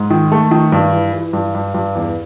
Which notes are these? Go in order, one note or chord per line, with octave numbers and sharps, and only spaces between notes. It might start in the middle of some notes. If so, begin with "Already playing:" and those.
Already playing: G#2
D#3
A3
D#3
G2
E3
E3
G2
G2
G2
E2